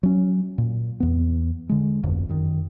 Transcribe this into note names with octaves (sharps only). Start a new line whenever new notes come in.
F#3 C#4
A#2
E2 B3
D3 G#3
D1 G1 F2
F#2 D#3